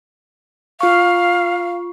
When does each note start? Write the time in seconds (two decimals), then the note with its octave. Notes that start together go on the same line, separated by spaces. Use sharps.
0.81 F4 F5 C#6